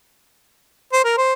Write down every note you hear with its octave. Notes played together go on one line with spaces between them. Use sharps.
C5
A#4
C5